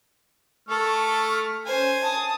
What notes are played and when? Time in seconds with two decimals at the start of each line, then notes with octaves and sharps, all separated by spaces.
0.69 A3 A4 C#6 F6
1.66 C#4 C5 G#5
2.04 A5 D#6